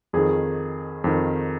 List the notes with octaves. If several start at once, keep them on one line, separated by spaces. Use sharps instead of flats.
F2 D#3 G#4
F2 D#3